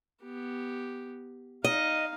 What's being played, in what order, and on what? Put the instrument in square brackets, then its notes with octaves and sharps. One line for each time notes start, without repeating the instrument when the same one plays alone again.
[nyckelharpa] B3 G4
[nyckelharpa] D#4 F5 [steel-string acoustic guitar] D#5